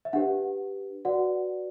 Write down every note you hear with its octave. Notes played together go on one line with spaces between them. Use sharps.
E5
D4 G4 B4 F#5
F#4 B4 D5 F#5